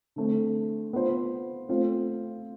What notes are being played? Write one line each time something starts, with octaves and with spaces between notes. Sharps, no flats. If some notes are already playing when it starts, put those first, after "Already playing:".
D3 A3 C4
B3 F4 C5
A3 C4 F4 C5